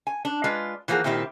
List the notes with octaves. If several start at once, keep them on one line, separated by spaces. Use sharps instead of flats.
G#5
D4
G#3 F4 B4 D5
E3 F3 A#3 F#4 G#4
A#2 D#3 C4 E4 G4